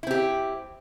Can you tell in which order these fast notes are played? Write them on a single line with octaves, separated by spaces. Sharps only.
E4 C4 G4